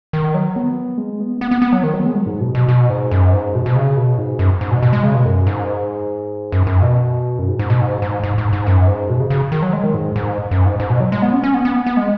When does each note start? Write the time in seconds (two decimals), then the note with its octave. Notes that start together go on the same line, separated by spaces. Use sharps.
0.13 D#3
0.34 F#3
0.56 B3
0.98 G#3
1.20 B3
1.41 B3
1.51 B3
1.62 B3
1.73 F#3
1.83 D#3
1.94 F#3
2.00 B3
2.05 G#3
2.16 F#3
2.26 G#2
2.40 B2
2.55 B2
2.68 B2
2.90 G#2
3.11 F#2
3.33 G#2
3.55 B2
3.66 B2
3.76 C#3
3.97 B2
4.18 G#2
4.39 F#2
4.61 G#2
4.72 B2
4.83 B2
4.93 G#3
5.04 C#3
5.14 B2
5.26 F#2
5.47 G#2
6.52 F#2
6.67 F#2
6.82 B2
7.39 F#2
7.49 G#2
7.59 G#2
7.70 B2
7.81 G#2
8.02 G#2
8.24 G#2
8.38 G#2
8.53 G#2
8.67 F#2
8.88 G#2
9.10 B2
9.20 C#3
9.30 C#3
9.52 D#3
9.62 F#3
9.73 G#3
9.83 D#3
9.94 G#2
10.16 G#2
10.51 F#2
10.66 G#2
10.80 G#2
10.90 B2
11.00 F#3
11.12 G#3
11.22 B3
11.33 C#4
11.43 C#4
11.54 B3
11.65 B3
11.87 B3
11.97 G#3